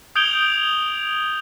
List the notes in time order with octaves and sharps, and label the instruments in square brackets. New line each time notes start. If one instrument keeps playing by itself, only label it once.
[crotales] D#6 G6 G#6 D7 F7 G7